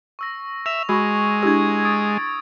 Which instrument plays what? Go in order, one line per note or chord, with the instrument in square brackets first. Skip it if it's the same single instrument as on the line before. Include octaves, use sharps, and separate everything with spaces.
[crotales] C#6 E6 A#6
[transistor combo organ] E5 [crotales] F7
[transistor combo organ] G#3 [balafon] F#4 B5 [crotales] C#6 E6
[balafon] D4 E4 G4 [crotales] E6 G#6
[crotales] D#6 A6 D7